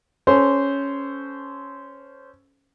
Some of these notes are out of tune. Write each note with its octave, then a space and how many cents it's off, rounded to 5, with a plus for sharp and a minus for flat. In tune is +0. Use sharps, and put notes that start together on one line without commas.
C#4 +0 A4 -5 C5 -15